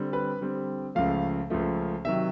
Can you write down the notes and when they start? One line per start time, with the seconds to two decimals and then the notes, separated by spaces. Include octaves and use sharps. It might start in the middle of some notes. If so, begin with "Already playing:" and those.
Already playing: D3 G3 C4
0.13 B4
0.41 D3 G3 C4
0.95 C#2 C#3 F3 A3 F5
1.50 C#2 C#3 F3 A3
2.05 C3 D#3 F#3 E5